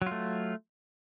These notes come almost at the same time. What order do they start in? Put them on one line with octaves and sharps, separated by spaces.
F#3 F4 A3